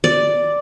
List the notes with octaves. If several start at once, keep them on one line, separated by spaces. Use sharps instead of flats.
D5